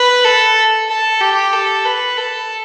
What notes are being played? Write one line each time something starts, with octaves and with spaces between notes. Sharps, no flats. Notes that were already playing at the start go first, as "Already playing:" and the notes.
Already playing: B4
A4
A4
G4
A4
B4
A4